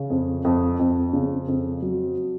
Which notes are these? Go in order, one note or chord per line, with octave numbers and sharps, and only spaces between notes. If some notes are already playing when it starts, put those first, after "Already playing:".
Already playing: C#3
F2
F2
F2
C#3
F2
F#3